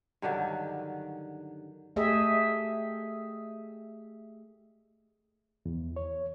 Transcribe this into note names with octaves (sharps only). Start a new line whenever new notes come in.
G2 D3 D#3 F#3
A3 G4 G#4 D#5 E5
E2
C#5